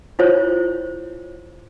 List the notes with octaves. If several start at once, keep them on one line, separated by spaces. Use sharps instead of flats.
E4 F4 C5 C#5